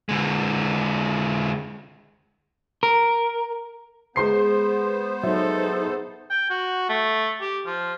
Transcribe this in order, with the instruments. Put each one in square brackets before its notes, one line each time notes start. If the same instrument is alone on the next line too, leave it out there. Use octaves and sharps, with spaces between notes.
[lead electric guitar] D3 G#3
[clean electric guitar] A#4
[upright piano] G#3 C6 C7 [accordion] B3 C5
[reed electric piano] F#3 E5 [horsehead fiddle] D#4 A4
[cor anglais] G5
F#4
A3
G4
F3